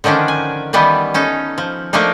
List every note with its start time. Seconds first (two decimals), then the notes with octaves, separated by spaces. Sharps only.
0.04 D3 D#3 F3 C#4 D4
0.28 G#5
0.73 D#3 E3 G3 B3
1.14 C#4 D#4 A4
1.58 F3
1.93 F3 A3 A#3 D4 D#4